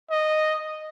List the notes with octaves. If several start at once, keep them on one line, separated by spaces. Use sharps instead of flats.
D#5